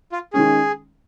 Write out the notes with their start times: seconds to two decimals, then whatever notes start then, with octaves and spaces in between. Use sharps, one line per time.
0.12 F4
0.33 D#3 G#3 C#4 G#4